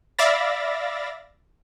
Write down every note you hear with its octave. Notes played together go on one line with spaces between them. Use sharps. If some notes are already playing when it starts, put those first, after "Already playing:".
D5 E5 F5 B5 A6 A#6